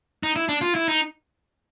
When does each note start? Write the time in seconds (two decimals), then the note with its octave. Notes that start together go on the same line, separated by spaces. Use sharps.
0.23 D#4
0.36 E4
0.49 D4
0.61 F4
0.75 E4
0.88 D#4